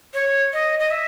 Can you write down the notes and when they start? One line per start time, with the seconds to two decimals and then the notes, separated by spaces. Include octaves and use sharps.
0.14 C#5
0.53 D#5
0.79 D#5
0.91 E5